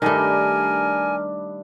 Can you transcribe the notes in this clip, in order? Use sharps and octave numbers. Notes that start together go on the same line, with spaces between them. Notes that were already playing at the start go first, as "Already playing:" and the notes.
G2 D#3 A3 D4 A#4 G#5 B5